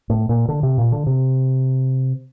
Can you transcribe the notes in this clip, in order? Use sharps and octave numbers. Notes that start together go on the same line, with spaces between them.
A2
A#2
D3
C3
A#2
D3
C3